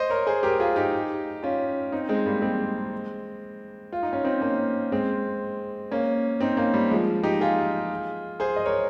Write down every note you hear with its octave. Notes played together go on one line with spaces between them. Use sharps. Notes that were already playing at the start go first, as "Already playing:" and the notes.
Already playing: C5 D#5
A#4 C#5
G#4 C5
G4 A#4
F4 G#4
D#4 G4
C#4 F4
C4 D#4
G#3 C4
G3 A#3
G#3 C4
F4
D#4
C#4
C4 D#4
A#3 C#4
G#3 C4
A#3 C#4
C4 D#4
A#3 C#4
G3
F3 G#3
D#4 G4
F4 G#4
G#4 C5
D#5
A#4 C#5